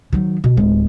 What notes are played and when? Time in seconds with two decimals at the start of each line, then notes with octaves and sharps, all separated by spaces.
0.13 D#3 F#3
0.44 B2
0.57 D1 G#3